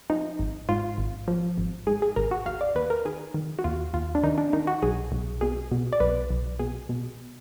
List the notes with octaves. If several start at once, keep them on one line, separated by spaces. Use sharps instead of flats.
F3 D#4
G#1
G#2 F4
G#1
F3
G#1
G#2 G#4
G#4
G#1 A#4
F#4
D#2 F5
D5
D#2 B4
A#4
D#3 G#4
D#3
F#4
D#2 F4
D#2 F4
D4
D#3 D#4
D4
D#3 D#4
F#4
B1 G#4
B1
B2 G#4
B2
D5
B1 B4
B1
B2 G#4
B2